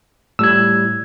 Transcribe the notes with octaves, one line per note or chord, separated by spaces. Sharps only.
A2 G3 E6 G#6